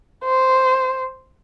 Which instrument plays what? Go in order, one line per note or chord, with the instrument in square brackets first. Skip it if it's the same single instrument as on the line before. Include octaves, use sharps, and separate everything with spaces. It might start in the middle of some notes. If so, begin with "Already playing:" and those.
[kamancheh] C5